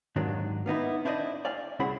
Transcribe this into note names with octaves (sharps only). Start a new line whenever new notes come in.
G#2 D#3 F#3 A#3 D4 G4
A#3 B3 D#4 E4
D4 E4 C5 D5 D#5
D5 F5 G#5
C2 C#4 E4 G#4 F#5 B5